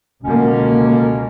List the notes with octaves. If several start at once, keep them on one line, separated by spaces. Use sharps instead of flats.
C#2 B2 D3 A#3 C#4